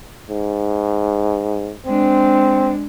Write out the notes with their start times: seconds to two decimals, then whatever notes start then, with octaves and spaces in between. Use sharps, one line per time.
0.30 G#2
1.86 G#3 C4 D4